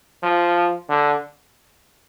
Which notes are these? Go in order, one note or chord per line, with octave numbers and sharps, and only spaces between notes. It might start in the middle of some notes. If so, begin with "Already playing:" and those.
F3
D3